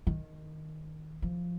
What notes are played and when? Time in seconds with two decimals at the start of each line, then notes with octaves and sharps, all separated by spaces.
0.07 D#3
1.22 F3